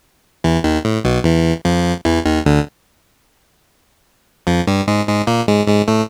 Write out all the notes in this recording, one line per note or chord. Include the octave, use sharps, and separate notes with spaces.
E2 E3
D#2 D#3
A2
B1 B2
E2 E3
F2 F3
E2 E3
D#2 D#3
D2 D3
F2 F3
G2 G3
G#2 G#3
G#2 G#3
A#2 A#3
G#2 G#3
G#2 G#3
A2 A3